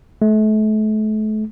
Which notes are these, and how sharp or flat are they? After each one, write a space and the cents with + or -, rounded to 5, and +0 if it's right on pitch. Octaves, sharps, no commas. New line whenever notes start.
A3 -35